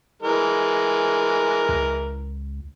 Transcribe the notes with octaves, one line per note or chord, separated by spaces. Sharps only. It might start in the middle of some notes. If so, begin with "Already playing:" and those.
E3 G#3 A#4
C#2